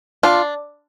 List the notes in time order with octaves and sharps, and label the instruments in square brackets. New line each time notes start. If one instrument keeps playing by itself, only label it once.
[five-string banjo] D4 F4